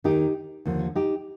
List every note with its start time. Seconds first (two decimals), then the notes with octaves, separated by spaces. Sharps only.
0.04 D#2 D#3 D#4 G4
0.65 D#2 D3 F3
0.96 D#4 G4